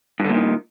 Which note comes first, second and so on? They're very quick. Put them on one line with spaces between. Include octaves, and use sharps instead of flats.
G2 D3 A#2 D#3